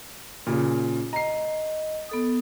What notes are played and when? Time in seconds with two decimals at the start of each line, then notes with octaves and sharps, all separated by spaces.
0.47 A#2 C#3
1.13 D#5 A#5 C7
2.09 B3 A4 D#6